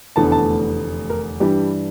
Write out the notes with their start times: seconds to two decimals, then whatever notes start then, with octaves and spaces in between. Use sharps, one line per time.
0.16 F1 E2 D3 A3 A5
0.32 A5
1.10 A#4
1.40 G2 E3 G3 D4 G4